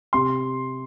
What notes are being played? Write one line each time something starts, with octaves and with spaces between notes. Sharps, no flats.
C3 C6